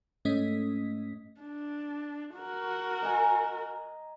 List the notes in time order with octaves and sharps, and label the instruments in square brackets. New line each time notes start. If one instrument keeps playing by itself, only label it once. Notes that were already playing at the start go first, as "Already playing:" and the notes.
[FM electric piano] G#2 A3 C#4 D#5 D#6 B6
[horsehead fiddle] D4
F#4 A#4
[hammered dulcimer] D#5 G#5 A#5